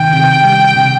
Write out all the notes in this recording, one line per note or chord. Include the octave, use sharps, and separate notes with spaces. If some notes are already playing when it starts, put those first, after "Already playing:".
Already playing: C3 D#3 G5
C3
G3
C3